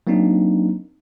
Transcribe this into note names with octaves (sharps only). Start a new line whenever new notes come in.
F#3 A#3 C4 D4 D#4